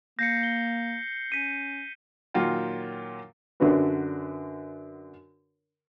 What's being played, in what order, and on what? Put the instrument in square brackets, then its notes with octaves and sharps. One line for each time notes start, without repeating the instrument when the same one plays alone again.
[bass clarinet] A#3 [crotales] G6 C7 C#7 [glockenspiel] A#6
[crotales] G7
[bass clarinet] C#4 [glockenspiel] B6 D#7
[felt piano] A#2 D#3 F#3 F4 F#4 G5
[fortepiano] F#2 D3 D4 F#4 B4